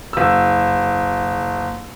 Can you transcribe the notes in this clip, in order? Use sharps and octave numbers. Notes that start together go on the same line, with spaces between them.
F#1 E6